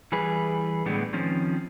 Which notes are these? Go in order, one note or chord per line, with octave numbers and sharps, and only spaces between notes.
E3 G3 G#4 B4
A2 D3 G3 G#3 B3
D#3 F3 C4 C#4